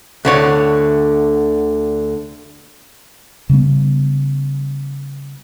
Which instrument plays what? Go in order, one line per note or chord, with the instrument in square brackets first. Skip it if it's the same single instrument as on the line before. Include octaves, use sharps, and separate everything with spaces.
[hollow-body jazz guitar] D2 D3 C#5
[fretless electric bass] C#3 G3 B3